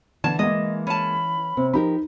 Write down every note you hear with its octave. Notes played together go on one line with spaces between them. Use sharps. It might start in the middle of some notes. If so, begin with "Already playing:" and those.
D3 E3 A5 G#6 E7
G#3 A#3 D#5
C#4 A5 B5
C3 C4
F3 D#4 G4 A#4 B5